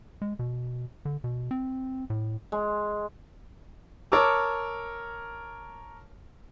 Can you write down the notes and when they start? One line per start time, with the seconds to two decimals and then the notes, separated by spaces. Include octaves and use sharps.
0.22 G#3
0.39 B2
1.05 D3
1.24 B2
1.51 C4
2.10 A2
2.52 G#3
4.12 A#4 C#5 A5 C#6 D6 E6